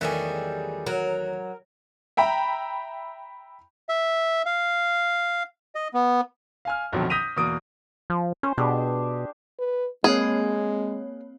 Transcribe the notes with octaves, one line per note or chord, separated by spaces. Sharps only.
E2 D#3 F#3 G3 A3 G#4
F#3 A#4
E5 G5 A#5 B5
E5
F5
D#5
B3
F5 G#5 F6
A#1 F2 B2 D3 D#3 F#3
D#6 G6 A#6 B6 D#7 F7
E2 B2 A#3 D#6 D7
F3
C#4 C5
B2 D4 G4 G#4
B4
G#3 A#3 C4 G#4 C#5